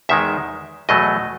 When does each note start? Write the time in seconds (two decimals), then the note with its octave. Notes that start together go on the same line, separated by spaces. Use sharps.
0.09 E2 D#3 G#3 E5
0.89 E2 B2 F#3 A3 D#5